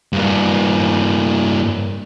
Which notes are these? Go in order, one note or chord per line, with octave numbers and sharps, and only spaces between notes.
G2 A#3